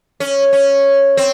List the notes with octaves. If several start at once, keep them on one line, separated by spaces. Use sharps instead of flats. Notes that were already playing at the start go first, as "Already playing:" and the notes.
C#4
C#4
C4